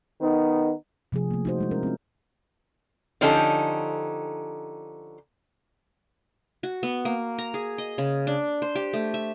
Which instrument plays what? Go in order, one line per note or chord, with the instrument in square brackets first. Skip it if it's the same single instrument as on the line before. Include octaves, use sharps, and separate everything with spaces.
[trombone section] D#3 B3 D#4
[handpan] C3 F3 A3 G#4
A3 A#3
D#4 F#4 C5
G3 G#3 E4
C#4 A#4
C4 F4
[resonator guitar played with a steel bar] D3 F3 C#4 D#4 G4 A4
[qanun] F#4
B3
A#3
A#5
G#4
D#5
C#3
D4
C5
G4
A3
E5